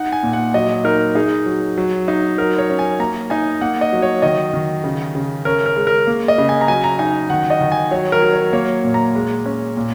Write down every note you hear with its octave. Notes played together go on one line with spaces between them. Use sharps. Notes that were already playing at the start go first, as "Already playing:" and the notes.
Already playing: D#4 F#5
G#5
A#2
F#5
F#3 D#5
D#4 A#4
D#4 G#4
F#3
F#3
D#4
F#3 A#4
C#5
C#4
G#5
A#3 A#5
D#4 G#5
A#3 F#5
D#5
F#3
C#5
D#3 D#5
D#3
C#3
C#3
C#4 A#4
A#4
G#3
A#4
A#3
D#5
C#3
G#5
A#5
F#3 G#5
A#5
D#4 G#5
D#3 F#5
D#5
D#3
G#5
F#3 C#5
A#4
F#3
C#5
A#3 C#5
A#2
A#5
G#3
C#4
A#2